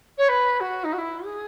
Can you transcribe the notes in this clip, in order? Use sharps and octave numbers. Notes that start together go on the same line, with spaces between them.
C#5
B4
F#4
D#4
F#4
E4
G#4